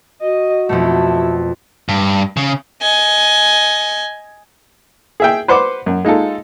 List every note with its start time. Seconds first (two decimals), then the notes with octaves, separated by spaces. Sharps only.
0.22 F#4 D#5
0.69 F2 B2 A3 E4
1.89 G2
2.37 C#3
2.82 D#5 G#5
5.20 G#4 E5 G5
5.48 B4 C5 F#5 C6 D6
5.86 F#2
6.05 G#3 D#4 F4 A4